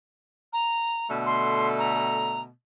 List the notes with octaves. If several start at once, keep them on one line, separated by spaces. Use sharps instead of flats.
A#5
B2 D3 A3
C6
A#5